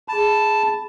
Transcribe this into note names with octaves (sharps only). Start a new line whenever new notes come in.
G#4 A5 B5